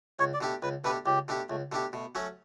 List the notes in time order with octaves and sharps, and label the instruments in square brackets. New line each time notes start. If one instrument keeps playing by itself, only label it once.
[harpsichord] C#2 [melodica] C#5
[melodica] D5
[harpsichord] B2 A3 D4 G4
[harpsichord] C#2 [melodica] B4
[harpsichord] B2 A3 D4 G4 [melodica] B4
[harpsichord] C#2 [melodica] G4
[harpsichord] B2 A3 D4 G4
[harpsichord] C#2 [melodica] A3
[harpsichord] B2 A3 D4 G4
[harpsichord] B2 [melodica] A3
[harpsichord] F#3 A3 C#4 F#4